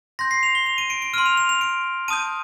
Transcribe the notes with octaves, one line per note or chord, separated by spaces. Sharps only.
C6 G6 A#6
C7
F7
G7
F7
D#7
D7
D7
C6 F6 D#7
F7
F7
F7
D7
A5 D#6 G6 D#7